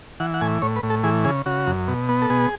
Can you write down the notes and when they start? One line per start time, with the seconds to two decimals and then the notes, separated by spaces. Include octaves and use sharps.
0.20 E3 F#5
0.34 F#5
0.41 A2 G#5
0.62 A2 C#5
0.76 B4
0.83 A2
0.90 A4
1.04 E3 G#4
1.25 C#3 G#4
1.46 C#3 F#4
1.67 F#2
1.88 B2
2.09 B3
2.22 A4
2.30 B2 G#4